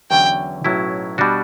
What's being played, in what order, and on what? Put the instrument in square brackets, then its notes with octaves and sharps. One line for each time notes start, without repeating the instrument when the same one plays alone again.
[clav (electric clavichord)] E2 D3 F#3 C#4 [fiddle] G5
[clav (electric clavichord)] B1 A2 F#3 C#4 E4
B2 G3 D4 F#4